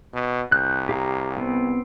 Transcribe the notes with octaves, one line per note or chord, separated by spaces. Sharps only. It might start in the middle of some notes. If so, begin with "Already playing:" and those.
B2
C2 F#6 G6
G4 F5 A#5
B3 C4